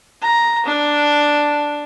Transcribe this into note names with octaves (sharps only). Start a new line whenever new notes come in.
A#5
D4